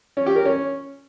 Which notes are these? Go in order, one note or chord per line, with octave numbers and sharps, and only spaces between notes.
C#4
G4
A#4
C#4